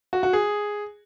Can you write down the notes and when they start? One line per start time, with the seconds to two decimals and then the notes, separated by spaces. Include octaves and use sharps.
0.13 F#4
0.23 F#4
0.33 G#4